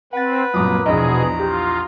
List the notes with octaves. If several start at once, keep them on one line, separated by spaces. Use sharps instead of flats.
C4 B4 F#5 A6
C2 F#2 A#2 A#3 A#5 D6 D#6
A#1 E2 B2 G#4 D#5 A#5 B5
F4 G4